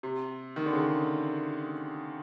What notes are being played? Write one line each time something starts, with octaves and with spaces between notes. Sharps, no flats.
C3
D#3
D3
C#3